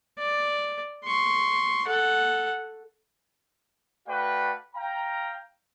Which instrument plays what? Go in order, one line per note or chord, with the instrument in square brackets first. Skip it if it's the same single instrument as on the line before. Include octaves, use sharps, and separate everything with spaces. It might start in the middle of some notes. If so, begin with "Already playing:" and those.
[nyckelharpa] D5
C6 C#6
A4 F#5
[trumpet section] A3 F#4 B4 D5 F5 G5
F5 G5 A#5